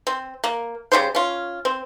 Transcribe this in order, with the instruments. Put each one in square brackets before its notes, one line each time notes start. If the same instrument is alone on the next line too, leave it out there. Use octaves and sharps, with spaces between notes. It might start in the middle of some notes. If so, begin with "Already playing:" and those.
[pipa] C4
A#3
C#3 G3 G4 C5
C#4 F4
C4